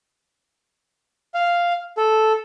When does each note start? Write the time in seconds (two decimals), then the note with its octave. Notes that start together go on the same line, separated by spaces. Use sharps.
1.34 F5
1.98 A4